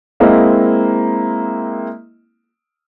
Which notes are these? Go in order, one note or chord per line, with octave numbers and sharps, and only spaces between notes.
G#3 A#3 C4 E4 D#5